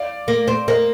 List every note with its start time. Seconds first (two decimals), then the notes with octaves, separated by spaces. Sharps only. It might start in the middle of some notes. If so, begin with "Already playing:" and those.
Already playing: D5 F5
0.28 A#3
0.48 C4
0.68 A#3 C5 D#5